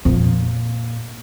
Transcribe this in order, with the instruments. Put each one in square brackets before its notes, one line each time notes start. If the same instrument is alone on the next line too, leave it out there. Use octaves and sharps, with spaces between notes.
[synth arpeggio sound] F2 [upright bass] A#2